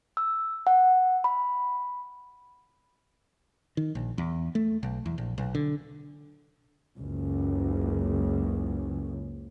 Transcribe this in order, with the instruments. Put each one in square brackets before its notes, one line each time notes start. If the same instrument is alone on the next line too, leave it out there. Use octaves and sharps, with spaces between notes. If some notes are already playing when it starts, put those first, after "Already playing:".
[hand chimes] E6
F#5
B5
[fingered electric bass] D#3
A#1
E2
A3
B1
E2
A#1
B1
D3
[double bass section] F#1 C#2